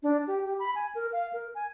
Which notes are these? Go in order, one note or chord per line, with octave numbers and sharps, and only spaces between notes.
D4
G4
G4
B5
G#5
A#4
F5
A#4
G#5